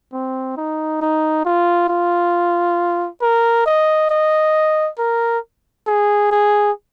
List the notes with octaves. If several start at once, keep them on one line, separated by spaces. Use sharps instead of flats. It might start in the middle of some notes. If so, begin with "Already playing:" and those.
C4
D#4
D#4
F4
F4
A#4
D#5
D#5
A#4
G#4
G#4